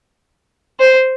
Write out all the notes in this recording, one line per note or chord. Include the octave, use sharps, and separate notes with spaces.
C5